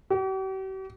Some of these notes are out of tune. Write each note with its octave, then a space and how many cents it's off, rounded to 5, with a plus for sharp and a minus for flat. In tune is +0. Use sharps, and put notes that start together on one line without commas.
G4 -45